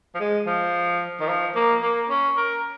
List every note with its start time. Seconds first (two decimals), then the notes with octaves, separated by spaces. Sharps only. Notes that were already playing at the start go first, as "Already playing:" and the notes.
0.15 F3
0.20 G#3
0.46 F3
1.20 D#3
1.28 F3
1.56 A#3
1.82 A#3
2.09 C#4
2.37 A#4